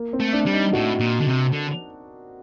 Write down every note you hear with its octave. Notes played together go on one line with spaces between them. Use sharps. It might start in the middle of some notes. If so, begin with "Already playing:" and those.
Already playing: A#3
C4
A3
D4
G3
D#4
A2 F#4
A#2
D3
C3
D3